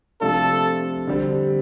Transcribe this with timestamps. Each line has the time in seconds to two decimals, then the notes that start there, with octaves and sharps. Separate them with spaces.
0.21 C3 F3 A3 D4 F4 A4
1.07 D3 G3 C4